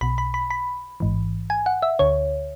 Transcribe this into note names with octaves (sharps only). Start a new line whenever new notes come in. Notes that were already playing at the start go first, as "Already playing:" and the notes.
B1 B2 B5
B5
B5
B5
A1 G#2 E3
G#5
F#5
E5
D2 D3 C#5